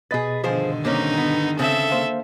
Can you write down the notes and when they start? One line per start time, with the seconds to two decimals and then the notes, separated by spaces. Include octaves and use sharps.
0.11 B2 G#4 B4 D#5 A6
0.44 G2 D3 D#3 F3 G#4 C5
0.85 A#3 C4 C#4 D#4
1.17 B3
1.59 C#3 C4 A4 E5
1.90 A#3 C5 F5